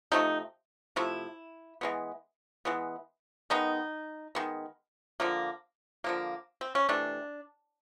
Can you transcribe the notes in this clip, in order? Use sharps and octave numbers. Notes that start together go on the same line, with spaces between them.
C3 F3 A3 D#4
C3 F3 A3 E4
E3 G#3 B3
E3 G#3 B3
D#3 G#3 B3 D#4
D#3 G#3 B3
D3 F3 A#3
D3 F3 A#3
C4
C#4
C3 E3 A3 D4